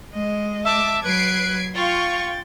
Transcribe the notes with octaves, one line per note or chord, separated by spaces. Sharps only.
G#3 D#5
E5 A5 D6
F#3 B4 F#6 G#6 C7 D7
F4 G5 C#6 A6